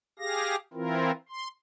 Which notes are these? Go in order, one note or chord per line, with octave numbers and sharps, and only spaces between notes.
G4 G#4 F5 A#6
E3 C4 E4 F4 A#4
C6